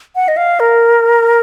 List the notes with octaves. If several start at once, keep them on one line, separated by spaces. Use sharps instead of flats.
F#5
D#5
F5
A#4